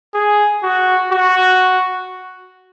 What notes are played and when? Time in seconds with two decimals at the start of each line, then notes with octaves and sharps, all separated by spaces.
0.14 G#4
0.63 F#4
1.12 F#4